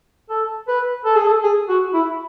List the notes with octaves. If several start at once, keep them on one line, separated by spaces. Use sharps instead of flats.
A4
B4
A4
G#4
A4
G#4
F#4
E4